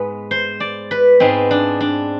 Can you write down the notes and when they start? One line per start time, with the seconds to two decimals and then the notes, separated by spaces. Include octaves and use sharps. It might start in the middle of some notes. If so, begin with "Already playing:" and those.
Already playing: G#2 G#3 B3 B4
0.31 C5
0.60 D5
0.91 B4
1.20 G#2 G#3 B3 C4
1.51 D4
1.80 D4